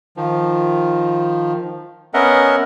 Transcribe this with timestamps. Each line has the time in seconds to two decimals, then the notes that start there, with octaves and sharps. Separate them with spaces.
0.17 D#3 F3
2.14 B3 C#4 A#4 D#5 E5 F#5